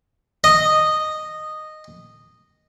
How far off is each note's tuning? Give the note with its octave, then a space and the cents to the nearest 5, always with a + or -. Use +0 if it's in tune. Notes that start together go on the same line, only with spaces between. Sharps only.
D#5 -10